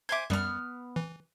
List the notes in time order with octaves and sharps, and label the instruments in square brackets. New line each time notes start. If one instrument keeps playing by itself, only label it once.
[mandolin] C5 G#5 D6 [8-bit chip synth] E5 G#6
[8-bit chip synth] F#2 G3 [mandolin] B3 F6
[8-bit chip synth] E3